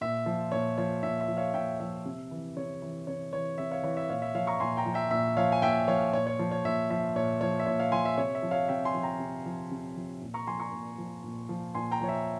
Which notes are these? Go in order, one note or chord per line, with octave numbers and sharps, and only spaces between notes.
A#2 E5
F3
A#2 C#5
F3 C#5
A#2 E5
E5
F3
C#5 F5
A#2 E5 G5
F3 E5
C3
E3
C3 C#5
E3
C3 C#5
E3 C#5
C3 E5
C#5 F5
E3 C#5
E5
A#2 C#5 F5
E5
F3 C#5 F5
A#5 C#6
A#2 G#5 C6
G5 A#5
F3
E5 G5
A#2 E5
F3 C#5 F5
G#5
A#2 E5 G5
F3 C#5 F5
A#2 C#5
C#5
F3
C#5
A#2 E5
F3 E5
A#2 C#5
F3 C#5
E5
A#2 C#5
C#5 F5
F3 G#5 C6
E5
C3 C#5
E5
F3
C#5 F5
C3 E5 G5
G#5 C6
F3
G5 A#5
C3
F3
C3
F3
A#2
A#5 C#6
F3 G#5 C6
A#5 C#6
A#2
F3
A#2
F3
A#2 G#5 C6
G5 A#5
F3 C#5
E5